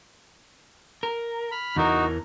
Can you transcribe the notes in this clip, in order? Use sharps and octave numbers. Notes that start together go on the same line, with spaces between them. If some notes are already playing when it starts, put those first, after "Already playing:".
A#4
B5 F6
E2 E3 D#4 F#4 A#4